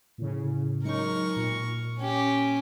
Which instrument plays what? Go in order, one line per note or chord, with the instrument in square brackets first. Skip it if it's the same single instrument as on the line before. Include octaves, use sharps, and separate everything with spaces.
[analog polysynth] A2 C#3
[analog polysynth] F#3 G#3 D#4 [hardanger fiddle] A#4 C#6
[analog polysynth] A#2
[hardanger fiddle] C#4 G4